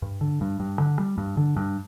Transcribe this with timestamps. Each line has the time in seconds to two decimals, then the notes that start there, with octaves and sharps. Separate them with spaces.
0.02 G2
0.21 D3
0.41 G2
0.60 G2
0.79 D3
0.99 G3
1.18 G2
1.37 D3
1.56 G2